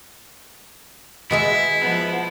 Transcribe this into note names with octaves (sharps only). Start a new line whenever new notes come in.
B2 G#3 E4 E5
F3 B3